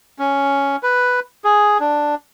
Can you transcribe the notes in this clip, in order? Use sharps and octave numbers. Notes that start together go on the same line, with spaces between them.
C#4
B4
G#4
D4